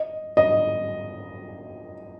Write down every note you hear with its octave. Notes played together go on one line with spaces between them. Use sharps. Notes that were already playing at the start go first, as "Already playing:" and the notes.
Already playing: D#5
D#5